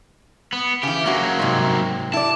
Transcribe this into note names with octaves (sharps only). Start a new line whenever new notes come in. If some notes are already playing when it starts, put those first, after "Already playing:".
B3
C#3 E3 G4
C#3 F#3 A#3 F#4
G#2 C3
E4 D5 A5